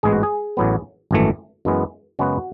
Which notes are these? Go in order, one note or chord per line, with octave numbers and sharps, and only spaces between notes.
A1 G#2 G#3 B3 G#4
F#4
G#4
A1 A2 F#3 B3
G#1 F#2 E3 A3
F#2 E3 G#3 B3
F#2 C#3 G#3 B3 F#4